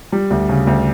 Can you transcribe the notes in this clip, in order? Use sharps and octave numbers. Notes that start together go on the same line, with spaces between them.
G3
D2
C#3
D2